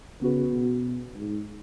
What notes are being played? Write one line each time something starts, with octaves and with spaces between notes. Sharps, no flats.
C#3 B3 F#4 B4
B2
G#2